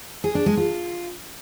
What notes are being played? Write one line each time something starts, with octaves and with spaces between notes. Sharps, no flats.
G#4
D4
G#3
F4